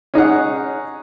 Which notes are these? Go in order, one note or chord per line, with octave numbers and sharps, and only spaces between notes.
C#4 D#4 G#4 F#5